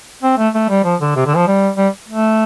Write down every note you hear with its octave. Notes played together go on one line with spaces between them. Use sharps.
C4
A3
A3
G3
F3
D3
C3
D3
F3
G3
G3
A3